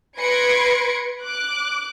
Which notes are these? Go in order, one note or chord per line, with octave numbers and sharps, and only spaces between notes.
B4 C6 G#6 A#6 C#7 D7
D6 F#6